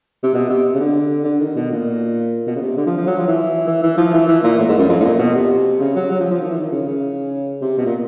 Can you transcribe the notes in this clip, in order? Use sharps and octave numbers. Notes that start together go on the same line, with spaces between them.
C3
B2
C3
C#3
D3
D3
D#3
B2
A#2
B2
C#3
C3
D3
F3
F3
F#3
F3
E3
E3
E3
F3
E3
E3
A#2
A2
G#2
F#2
F2
A2
A#2
B2
C3
C#3
F#3
F#3
F3
F3
D#3
E3
D#3
C#3
C#3
C3
B2
A#2